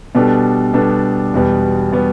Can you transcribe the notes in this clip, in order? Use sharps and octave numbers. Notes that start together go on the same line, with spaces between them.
B2 G3 B3 D4 A4
B2 G3 B3 D4 A4
E1 E2 B2 G3 B3
B2 G3 B3